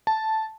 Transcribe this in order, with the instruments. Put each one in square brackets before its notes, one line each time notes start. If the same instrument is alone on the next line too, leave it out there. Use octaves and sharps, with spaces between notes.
[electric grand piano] A5